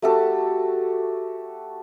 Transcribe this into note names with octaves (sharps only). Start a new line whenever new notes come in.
A3 F#4 G4 A4